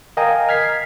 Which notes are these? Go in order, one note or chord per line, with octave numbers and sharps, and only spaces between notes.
A#4 D#5 F5 G5 G#5 A#5
F6 G#6 B6 C7